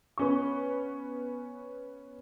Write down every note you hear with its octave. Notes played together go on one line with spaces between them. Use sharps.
B3 C#4 C#6